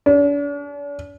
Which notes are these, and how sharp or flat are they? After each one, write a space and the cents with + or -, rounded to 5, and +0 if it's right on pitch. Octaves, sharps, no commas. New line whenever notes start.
D4 -45